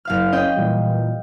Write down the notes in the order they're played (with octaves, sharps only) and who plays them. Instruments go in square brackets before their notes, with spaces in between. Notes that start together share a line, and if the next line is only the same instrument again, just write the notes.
[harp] F#1 F5 F6
[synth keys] C#4 [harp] D#5 G5
[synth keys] A#2 E3 G3